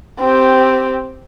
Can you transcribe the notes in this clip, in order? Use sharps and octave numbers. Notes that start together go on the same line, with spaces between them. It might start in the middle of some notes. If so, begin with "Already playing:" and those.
C4 G4